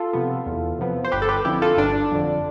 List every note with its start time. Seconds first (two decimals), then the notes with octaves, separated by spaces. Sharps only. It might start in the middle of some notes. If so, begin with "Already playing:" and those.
Already playing: F4 A4
0.13 C3 F3 B3
0.46 E2
0.79 C3 F3 B3
1.04 C5
1.12 G1 G4 B4
1.22 A4
1.29 G4 B4
1.45 F2 D3 E4 G4
1.62 F4 A4
1.78 G1 D4
2.12 F2 D3